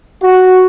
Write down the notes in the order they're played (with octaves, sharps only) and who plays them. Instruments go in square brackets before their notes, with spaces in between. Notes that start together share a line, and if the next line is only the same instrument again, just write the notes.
[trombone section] F#4